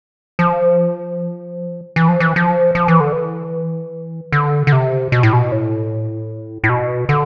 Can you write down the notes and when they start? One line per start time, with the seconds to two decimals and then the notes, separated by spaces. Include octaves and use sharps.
0.39 F3
1.96 E3
2.08 F3
2.20 E3
2.36 F3
2.75 F3
2.88 E3
3.00 D3
3.13 E3
4.32 D3
4.67 D3
4.72 C3
5.12 B2
5.23 A2
5.33 B2
5.52 A2
6.64 A2
6.69 B2
7.09 D3